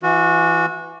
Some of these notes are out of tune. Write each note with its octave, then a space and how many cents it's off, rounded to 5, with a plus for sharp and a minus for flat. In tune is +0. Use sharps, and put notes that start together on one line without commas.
E3 +10 F#4 -25